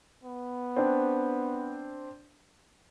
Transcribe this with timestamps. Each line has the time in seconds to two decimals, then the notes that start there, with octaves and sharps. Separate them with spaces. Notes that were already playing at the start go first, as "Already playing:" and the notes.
0.24 B3
0.76 C4 D4